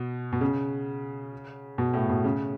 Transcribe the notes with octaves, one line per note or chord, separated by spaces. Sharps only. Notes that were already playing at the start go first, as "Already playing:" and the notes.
Already playing: B2
B2
C#3
B2
A2
B2
C#3